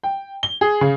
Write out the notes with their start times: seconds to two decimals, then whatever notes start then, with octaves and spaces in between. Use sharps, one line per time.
0.04 G5
0.43 G7
0.61 G#4
0.81 C#3